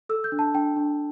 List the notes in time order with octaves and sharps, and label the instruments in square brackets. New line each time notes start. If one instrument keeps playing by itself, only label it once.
[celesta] A4 E6
G6
D4
A5
D4 G5
D4